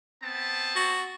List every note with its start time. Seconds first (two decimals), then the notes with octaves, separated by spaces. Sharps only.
0.23 B3 C4 A5
0.76 F#4